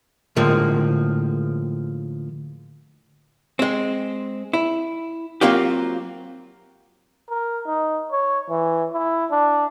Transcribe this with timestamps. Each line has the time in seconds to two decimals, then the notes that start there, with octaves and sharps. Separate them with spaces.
0.36 A2 D3 F3 G#3 A#3
3.59 G#3 C4
4.53 E4
5.41 F#3 A#3 C4 F4 G4
7.30 A#4
7.66 D#4
8.12 C#5
8.50 E3
8.93 E4
9.31 D4